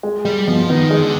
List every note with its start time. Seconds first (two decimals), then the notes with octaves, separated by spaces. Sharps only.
0.03 G#3
0.25 G3 G#3
0.47 B2 F3
0.70 D#3 B3
0.91 G#3
1.02 D3